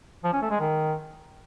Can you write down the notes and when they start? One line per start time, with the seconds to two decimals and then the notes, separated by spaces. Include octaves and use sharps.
0.24 F3
0.33 C#4
0.42 A3
0.51 G#3
0.60 D#3